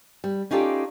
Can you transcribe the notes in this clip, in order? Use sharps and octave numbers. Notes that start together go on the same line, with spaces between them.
G3
C#4 D#4 F4 G4 A4 D5